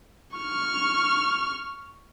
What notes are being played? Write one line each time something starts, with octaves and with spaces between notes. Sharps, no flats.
C#6 F6